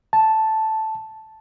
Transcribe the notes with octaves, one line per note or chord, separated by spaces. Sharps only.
A5